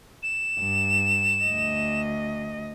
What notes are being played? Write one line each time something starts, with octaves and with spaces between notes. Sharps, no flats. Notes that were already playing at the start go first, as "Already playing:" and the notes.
E7
G2
D2 D#5